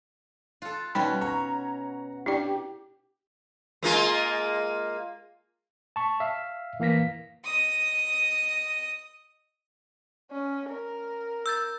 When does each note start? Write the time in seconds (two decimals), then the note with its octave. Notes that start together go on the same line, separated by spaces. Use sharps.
0.62 F4 A4 F#6
0.95 B2 G3 C#4 D#4 F#4 G5 B5
1.21 C#5 F#5 A#5
2.26 D4 E4 G4 D5
3.83 G#3 A#3 F4
5.96 A5 C#6
6.20 E5 F5
6.80 E3 A#3 F5 A#6 B6
7.44 D#5 D#6
10.31 C#4
10.69 A#4
11.46 E6 G6 A6